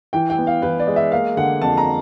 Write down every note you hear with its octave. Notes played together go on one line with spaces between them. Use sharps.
E3 G5
G5
B3
F5
E3 B4
D5
G#3
E5
A#3 F5
D3 F#5
F2 A5
A#5